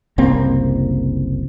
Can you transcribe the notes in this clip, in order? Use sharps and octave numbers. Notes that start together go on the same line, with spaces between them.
F#1 C2 A#3 C4